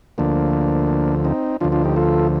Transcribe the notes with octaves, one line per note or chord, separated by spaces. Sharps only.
D2 D3 F3 A#3 D4
C4 D#4
D2 D3 F3 D4 F4
D4 F4
D#4 G4
F4 A4